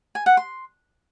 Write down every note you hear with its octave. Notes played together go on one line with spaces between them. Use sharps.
G#5
F#5
C6